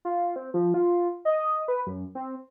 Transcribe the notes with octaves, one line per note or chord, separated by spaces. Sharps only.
F4
C4
F3
F4
D#5
B4
F#2
C4